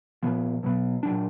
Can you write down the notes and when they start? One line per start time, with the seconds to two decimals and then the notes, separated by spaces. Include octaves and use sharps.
0.23 A#2 F3 B3
0.63 B2 F#3 B3
1.03 A#2 F#3 D4